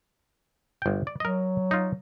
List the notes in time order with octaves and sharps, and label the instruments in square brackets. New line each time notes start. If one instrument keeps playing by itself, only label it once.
[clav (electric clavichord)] G1 G5
D5
[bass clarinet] F#3 [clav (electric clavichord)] A#4 D#5
[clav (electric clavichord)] D#4 F4